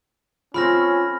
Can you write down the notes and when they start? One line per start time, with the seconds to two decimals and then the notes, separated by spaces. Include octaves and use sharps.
0.54 F3 A3 C4 C#4 F4 B5 F6 A#6